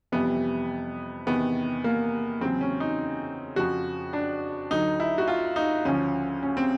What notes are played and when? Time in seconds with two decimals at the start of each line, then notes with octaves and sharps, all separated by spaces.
0.12 F2 C3 E3 G3 B3
1.27 E2 C3 D#3 B3
1.84 A#3
2.41 E2 C#3 F#3 C4
2.61 C#4
2.80 D#4
3.56 F2 C#3 F3 F#4
4.13 D4
4.71 D2 D3 F#3 D#4
5.00 E4
5.18 F#4
5.28 F4
5.56 D#4
5.85 D2 C#3 F3 C#4
6.43 C#4
6.57 C4